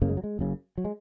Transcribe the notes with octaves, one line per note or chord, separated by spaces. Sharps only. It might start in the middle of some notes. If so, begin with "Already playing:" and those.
F#1 F#2 C#3 A#3
G#3
F#3
G#3
F#1 F#2 C#3
F#3
G#3